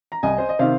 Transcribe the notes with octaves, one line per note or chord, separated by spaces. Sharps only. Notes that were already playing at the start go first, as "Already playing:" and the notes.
A#5
C2 D#5 G#5
C5
D#5
C3 D#3 C5 F5